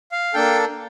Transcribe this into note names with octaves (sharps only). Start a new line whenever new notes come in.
F5
A#3 D4 A4 G5